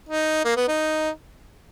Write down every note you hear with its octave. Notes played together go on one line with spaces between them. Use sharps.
D#4
A#3
B3
D#4